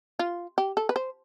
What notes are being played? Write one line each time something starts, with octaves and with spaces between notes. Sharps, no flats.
F4
G4
A4
B4
C5